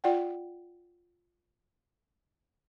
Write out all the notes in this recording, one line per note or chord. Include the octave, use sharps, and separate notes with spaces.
F4 D5 F#5 G5